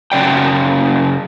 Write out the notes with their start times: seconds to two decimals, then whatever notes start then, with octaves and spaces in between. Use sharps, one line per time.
0.12 F#2 C#3 D5 G5